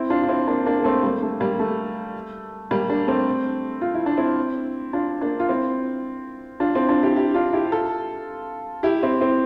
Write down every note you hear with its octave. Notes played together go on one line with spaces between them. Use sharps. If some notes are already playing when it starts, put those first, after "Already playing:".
Already playing: C4 E4
D4 F4
F4
C4 E4
A#3 D4
A#3 D4
A#3
A3 C4
G3 A#3
A3
G3 A#3
A3
G3 A#3
A#3 D4
A3 C4
F4
E4
D4
C4 E4
D4 F4
A#3 D4
F4
C4 E4
D4 F4
C4 E4
D4 F4
E4 G4
E4 G4
D4 F4
E4 G4
F4 A4
E4 G4
C4 E4
C4 E4